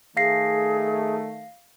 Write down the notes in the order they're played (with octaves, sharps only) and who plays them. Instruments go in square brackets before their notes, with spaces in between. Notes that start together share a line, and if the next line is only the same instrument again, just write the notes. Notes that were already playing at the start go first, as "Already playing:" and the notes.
[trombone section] D#3 A3 [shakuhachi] G#4 [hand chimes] F5 A#6 C7